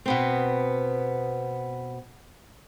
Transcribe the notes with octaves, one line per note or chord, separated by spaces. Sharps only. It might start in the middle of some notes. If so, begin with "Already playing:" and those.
B2 B3 C4